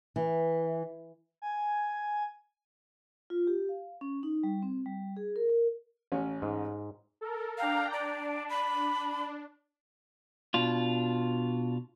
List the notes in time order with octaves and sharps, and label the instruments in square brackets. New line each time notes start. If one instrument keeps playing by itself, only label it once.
[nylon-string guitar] E3
[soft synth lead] G#5
[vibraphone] F4
G4
F5
C#4
D#4
G3
C4
G3
G#4
A#4
A#4
[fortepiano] A1 C#4
[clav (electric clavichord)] G#2
[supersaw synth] A4 A#4
[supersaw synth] D4 G5 A#5 [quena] F5
[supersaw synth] D4 [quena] D5
[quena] B5
[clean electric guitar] B2 D4 F4